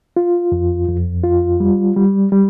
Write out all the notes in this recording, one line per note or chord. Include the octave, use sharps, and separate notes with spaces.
F4
F2
F2
F4
G3
G3
G3